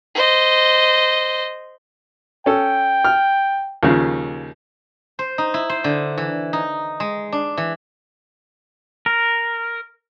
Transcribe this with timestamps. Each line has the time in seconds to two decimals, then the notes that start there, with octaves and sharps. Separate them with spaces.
0.15 C5 D#5
2.46 C#4 A4 G5
3.05 F6
3.83 D#2 C#3 F3
5.19 C5
5.38 D#4
5.54 E4
5.69 C5
5.84 D3
6.18 E3
6.53 D#4
7.00 G#3
7.32 D4
7.58 E3
9.06 A#4